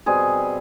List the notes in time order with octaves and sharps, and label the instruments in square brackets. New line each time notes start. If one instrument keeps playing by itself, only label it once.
[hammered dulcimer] B2 G3 C4 G#4